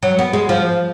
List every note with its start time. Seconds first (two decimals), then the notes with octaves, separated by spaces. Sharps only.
0.03 F#3
0.19 B3
0.33 G#3
0.49 F3